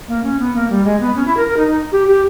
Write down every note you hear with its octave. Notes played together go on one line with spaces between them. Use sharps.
A#3
C#4
B3
A#3
G3
G#3
B3
C#4
E4
A#4
A#4
D#4
D#4
G4
G4